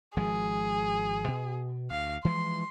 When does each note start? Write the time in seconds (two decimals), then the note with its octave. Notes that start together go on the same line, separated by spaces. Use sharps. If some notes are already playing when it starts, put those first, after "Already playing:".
0.17 G#1 F3 G#3 G#4
1.28 B2
1.91 D2 F5
2.25 E3 F3 G#3 C6